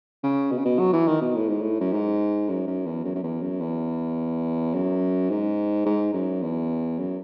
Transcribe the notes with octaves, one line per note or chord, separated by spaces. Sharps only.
C#3
B2
C#3
B2
F#3
E3
D#3
B2
A2
G#2
A2
F#2
G#2
F#2
F#2
E2
F#2
F#2
E2
F#2
E2
F#2
G#2
G#2
F#2
E2
F#2